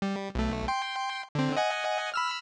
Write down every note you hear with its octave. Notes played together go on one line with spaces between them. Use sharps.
G3
B1 A3
G5 C6
D3 C4
D#5 F#5 G#5
B5 E6 F6